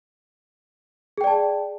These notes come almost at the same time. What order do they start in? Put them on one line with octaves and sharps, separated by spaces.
G#4 G5 D5 A5